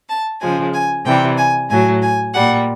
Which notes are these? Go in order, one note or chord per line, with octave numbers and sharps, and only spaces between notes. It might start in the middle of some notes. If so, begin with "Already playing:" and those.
A5
C#3 F3 G#3 G#5
G#5
C3 E3 G3 G5
G#5
A2 F#3 G#5
G#5
A#2 G3 F#5